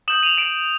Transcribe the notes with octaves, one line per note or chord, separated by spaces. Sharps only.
D#6 G6 E7 F#7
D#7 F7
D7 E7